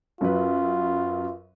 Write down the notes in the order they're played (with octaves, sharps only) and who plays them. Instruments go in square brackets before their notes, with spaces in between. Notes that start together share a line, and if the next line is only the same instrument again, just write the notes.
[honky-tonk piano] F#2 F#3 B4 [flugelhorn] F4